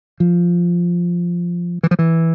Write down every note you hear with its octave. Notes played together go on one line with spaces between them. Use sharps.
F3
E3
F3
E3